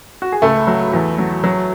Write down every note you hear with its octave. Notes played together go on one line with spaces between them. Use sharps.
F#4
G#4
C#2 A3 A4
F#3
E2
F#3
F#3